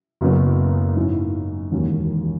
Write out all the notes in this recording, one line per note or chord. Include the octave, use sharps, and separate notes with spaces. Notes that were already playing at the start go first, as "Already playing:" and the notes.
F#1 F#2 C#3 F#3 B3
G#2 F#3 C#4 E4
E1 D#2 D#3 F#3 C#4